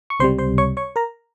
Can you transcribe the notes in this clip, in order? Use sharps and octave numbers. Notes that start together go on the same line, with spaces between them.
C#6
C#2 C3 G3 C5 C6
C5 C6
C#5 C#6
C#5 C#6
A#4 A#5